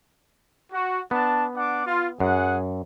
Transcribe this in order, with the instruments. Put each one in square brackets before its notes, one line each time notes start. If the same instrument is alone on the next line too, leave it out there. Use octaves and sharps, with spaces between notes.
[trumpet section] F#4
[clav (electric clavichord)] B3 [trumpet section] D4 A5
[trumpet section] D4 F#5 D6
F4
[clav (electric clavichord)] F#2 [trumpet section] G#4 F#5